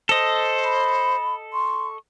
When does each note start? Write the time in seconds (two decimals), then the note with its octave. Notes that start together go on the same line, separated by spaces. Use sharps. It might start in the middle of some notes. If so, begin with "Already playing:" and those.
0.09 A4 C5 D#5
0.64 B5
1.53 C6 C#6